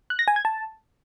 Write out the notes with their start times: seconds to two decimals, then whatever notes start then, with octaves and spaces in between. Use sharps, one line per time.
0.10 F#6
0.19 A#6
0.28 G#5
0.36 G#6
0.45 A5